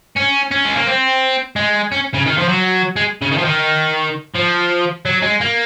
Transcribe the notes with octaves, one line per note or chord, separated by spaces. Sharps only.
C#4
C#4
G#3
A#3
C4
G#3
C#4
C#3
D#3
F3
F#3
G#3
C#3
D#3
F3
D#3
F3
F#3
G#3
A#3